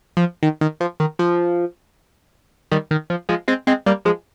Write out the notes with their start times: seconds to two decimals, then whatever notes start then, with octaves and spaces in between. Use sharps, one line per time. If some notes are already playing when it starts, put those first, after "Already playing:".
0.17 F3
0.43 D#3
0.61 D#3
0.80 F3
1.00 D#3
1.19 F3
2.72 D#3 G3
2.91 D#3
3.10 F3
3.29 F3 G#3
3.48 G#3 C4
3.67 G#3 C4
3.86 G3 A#3
4.05 F3 G#3